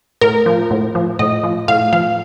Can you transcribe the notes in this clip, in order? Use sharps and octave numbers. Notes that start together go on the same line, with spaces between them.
A2 A#4
F3
A2
F3
A2 D#5
F3
A2 F5
F3 F5